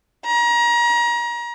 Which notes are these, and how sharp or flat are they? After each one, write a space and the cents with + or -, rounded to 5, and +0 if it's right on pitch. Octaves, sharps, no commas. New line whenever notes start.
A#5 +30